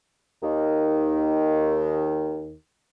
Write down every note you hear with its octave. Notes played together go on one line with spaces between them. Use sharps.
D#2 D#3